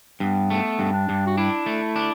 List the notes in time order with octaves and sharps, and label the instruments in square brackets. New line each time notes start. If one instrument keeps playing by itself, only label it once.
[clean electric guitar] G2 [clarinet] B3
[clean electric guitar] A3 [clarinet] B3
[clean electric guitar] G2
[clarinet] D4
[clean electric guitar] G2
[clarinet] F#4
[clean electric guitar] D4 [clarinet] E4
[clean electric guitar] A3
D4